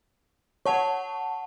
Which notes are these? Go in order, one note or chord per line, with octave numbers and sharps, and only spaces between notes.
C#5 F#5 A5 C#6